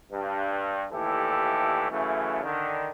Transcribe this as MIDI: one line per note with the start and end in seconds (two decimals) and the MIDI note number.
0.12 0.87 43
0.93 1.90 39
0.93 1.90 45
0.93 1.90 52
0.93 1.90 64
0.93 1.90 67
0.93 1.90 69
1.91 2.43 42
1.91 2.43 49
1.91 2.43 52
1.91 2.43 57
2.43 2.91 50
2.43 2.91 51